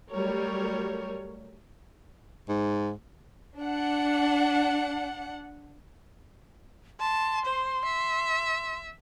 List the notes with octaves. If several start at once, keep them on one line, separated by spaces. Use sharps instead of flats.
F#3 G3 A3 A#4 C#5
G#2
D4 F#5
A5 C6
C5
E5